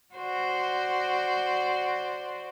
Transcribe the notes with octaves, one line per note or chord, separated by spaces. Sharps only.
F#4 C5 D5